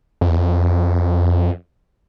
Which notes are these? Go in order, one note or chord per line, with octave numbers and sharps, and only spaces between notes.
F2
E2
F2